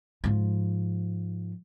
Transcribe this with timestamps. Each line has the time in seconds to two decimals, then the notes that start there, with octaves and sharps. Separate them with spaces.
0.24 G#2 F3